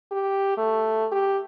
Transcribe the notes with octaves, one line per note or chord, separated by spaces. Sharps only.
G4
A3
G4